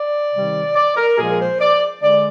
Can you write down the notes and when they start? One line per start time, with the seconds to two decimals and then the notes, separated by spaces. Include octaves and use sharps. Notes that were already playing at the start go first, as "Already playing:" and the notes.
Already playing: D5
0.34 C3 D#3 G3
0.76 D5
0.97 A#4
1.18 A#2 F3 G#3 G#4
1.29 A#4
1.40 C5
1.61 D5
2.03 D3 G#3 D5